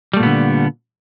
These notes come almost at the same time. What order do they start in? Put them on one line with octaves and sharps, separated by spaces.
G3 A3 A#2 B3 D3